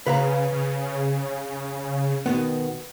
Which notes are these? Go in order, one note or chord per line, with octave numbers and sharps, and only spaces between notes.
C#3 B4 F5 A#5
C#3
B2 D#3 B3